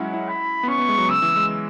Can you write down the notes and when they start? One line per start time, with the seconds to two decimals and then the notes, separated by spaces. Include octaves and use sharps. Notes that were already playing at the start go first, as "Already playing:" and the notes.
Already playing: F#3 G#3 C#4 E4 F#5
0.14 E4
0.28 B5
0.63 B3
0.68 C#4 C#6
0.78 B3
0.89 G#3
0.98 F#3
1.09 C#3 E6
1.22 E3
1.36 G#3